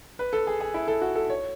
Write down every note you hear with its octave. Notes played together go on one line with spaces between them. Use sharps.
B4
A4
G#4
G#4
E4
A4
F#4
A4
C#5